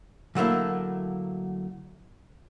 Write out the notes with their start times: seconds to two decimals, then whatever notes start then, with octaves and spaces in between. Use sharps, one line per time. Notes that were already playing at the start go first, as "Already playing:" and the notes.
0.35 D3 F#3 A3 A#3 E4